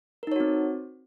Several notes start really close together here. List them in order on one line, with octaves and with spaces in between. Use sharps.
A#4 D#4 C#5 F#4 C4